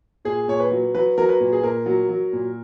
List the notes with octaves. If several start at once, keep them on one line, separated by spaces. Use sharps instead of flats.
A#2 G#4
A#2 C#5
B4
F#3
F#3 B4
F#3 A#4
B4
A#2
G#4
A#2 A#4
F#3
F#3
A#2